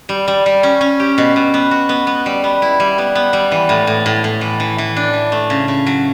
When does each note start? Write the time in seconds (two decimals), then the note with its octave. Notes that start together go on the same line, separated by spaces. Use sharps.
0.09 G3
0.28 G3
0.46 G3
0.63 C#4
0.81 C#4
1.00 G4
1.18 B2
1.36 B2
1.54 B3
1.71 F#4
1.89 B3
2.07 B3
2.26 G3
2.44 B3
2.62 E4
2.80 G3
2.98 B3
3.15 B3
3.33 G3
3.52 E3
3.69 A2
3.87 A2
4.06 A2
4.24 A2
4.41 E3
4.60 E3
4.78 E3
4.96 D4
5.13 E3
5.32 A3
5.50 C#3
5.68 C#3
5.86 F#3